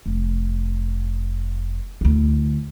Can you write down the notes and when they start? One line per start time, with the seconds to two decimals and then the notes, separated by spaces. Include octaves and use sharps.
0.06 F1
2.01 D2 E4